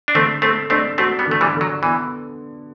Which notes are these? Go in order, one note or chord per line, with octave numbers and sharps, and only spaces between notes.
D4
D3 A3 C4
A3 C4 A4
A3 C4 D4
A3 C4 F#4
G3 B3
D3 A3
E3 G3
D3
F#3
E3 B3